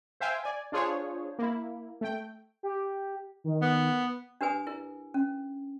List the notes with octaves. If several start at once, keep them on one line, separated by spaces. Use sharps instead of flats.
C5 E5 F5 G5 G#5
D5 G#5
D4 F4 G#4 C5 C#5
A#3 E4
A3 G5
G4
D#3
B3
D4 G4 A#4 B4 G#5 D#6
E4 A#4
C#4